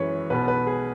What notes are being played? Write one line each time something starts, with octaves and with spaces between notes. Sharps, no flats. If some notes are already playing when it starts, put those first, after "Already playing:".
Already playing: F#2 E3 G#3 C#4 B4 C#5
B1 B2 B3 B4
B4
G#4